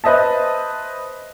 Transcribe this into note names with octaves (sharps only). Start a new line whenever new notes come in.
B4 C5 D#5 E5 A5